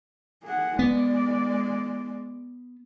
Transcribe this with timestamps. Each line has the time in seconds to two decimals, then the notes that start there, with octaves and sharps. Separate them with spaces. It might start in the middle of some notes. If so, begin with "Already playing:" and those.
0.44 G#4 F#5
0.79 G#3 B3 D5